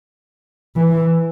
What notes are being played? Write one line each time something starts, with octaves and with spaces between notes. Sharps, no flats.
E3